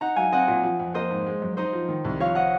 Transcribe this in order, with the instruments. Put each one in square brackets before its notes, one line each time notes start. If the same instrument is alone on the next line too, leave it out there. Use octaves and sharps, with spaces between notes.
[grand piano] D#4 [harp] F#5 A#5
[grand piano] F#3 [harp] F5 G#5
[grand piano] C4 [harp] D#5 F#5
[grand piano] A#2
F3
F2
[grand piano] A#3 [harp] C5 D#5
[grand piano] G#2
G#3
F#2
[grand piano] D#4 [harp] C5 D#5
[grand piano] F3
D#3
C2
[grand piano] F3 [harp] C#5 F5
[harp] D#5 F#5